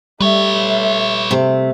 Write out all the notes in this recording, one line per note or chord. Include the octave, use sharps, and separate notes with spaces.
G3 A3 B4 C#5 E5
C3 A3